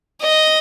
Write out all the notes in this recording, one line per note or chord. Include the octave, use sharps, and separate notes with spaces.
D#5